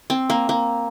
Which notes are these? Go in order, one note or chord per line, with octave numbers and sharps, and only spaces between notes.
C4
A#3
A#3